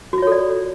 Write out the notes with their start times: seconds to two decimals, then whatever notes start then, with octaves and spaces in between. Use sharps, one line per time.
0.13 F#4
0.18 F4
0.22 C#5
0.27 A4
0.32 D5